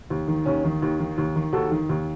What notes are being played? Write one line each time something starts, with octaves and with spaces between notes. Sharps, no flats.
D#2
D#3
D#2 C#4
D#3
D#2
D#3
D#2
D#3
D#2 F#4 A4
D#3
D#2